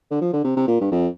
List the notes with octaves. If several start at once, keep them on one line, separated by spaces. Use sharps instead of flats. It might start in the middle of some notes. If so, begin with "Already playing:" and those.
D3
F3
D3
C3
C3
A#2
G2
F2